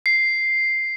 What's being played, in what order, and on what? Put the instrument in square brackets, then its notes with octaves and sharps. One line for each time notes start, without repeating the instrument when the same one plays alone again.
[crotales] C7